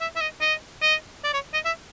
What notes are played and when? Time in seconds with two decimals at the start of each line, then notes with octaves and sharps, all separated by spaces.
0.01 E5
0.16 E5
0.21 D#5
0.41 D#5
0.82 D#5
1.24 D5
1.34 C#5
1.54 D#5
1.65 E5